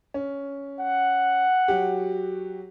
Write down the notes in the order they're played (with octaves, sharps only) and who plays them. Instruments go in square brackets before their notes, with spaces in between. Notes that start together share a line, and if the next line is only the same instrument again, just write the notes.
[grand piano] C#4
[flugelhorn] F#5
[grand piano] F#3 F#4 G4